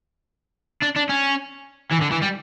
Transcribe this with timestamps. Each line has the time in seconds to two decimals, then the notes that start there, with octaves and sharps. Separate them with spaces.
0.82 D4
0.96 D4
1.09 C#4
1.91 E3
2.01 D3
2.11 E3
2.22 G3